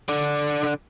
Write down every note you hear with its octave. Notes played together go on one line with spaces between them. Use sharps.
D3 D4